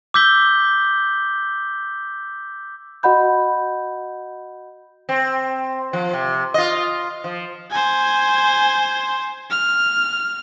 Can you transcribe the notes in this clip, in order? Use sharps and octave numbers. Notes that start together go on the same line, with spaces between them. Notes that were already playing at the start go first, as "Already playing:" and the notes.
D6 E6 G6 B6 G7
F#4 D#5 F#5 B5 G6
C4
F3
C3
F4 D#5
F3
C5 G#5
F6